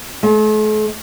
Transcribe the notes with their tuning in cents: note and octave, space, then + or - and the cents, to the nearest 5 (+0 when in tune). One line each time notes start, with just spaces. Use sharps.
A3 -45